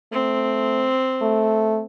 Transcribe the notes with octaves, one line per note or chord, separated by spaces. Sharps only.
A3 C4
A3